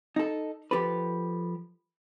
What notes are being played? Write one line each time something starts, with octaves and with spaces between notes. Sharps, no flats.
D#4 A4
F3 G4 A4 B4